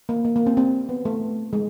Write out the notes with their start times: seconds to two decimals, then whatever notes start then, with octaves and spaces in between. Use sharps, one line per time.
0.09 A#3
0.25 A#3
0.36 A#3
0.46 C4
0.57 C4
0.89 B3
1.05 A3
1.53 G#3